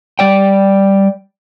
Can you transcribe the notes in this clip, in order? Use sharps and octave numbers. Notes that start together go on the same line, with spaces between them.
G3 D5 G5